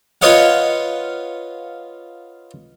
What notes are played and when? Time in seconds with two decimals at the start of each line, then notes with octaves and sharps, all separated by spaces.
0.22 F4 B4 C#5 D#5 F5 F#5